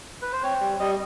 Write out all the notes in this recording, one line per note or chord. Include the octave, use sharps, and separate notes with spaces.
B4
C5
C4 C#5
G3
G3 D#5